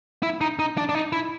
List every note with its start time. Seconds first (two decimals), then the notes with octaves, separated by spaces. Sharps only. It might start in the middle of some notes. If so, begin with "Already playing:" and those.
0.23 E4
0.41 D#4
0.59 D#4
0.77 D4
0.89 D4
0.95 D#4
1.13 E4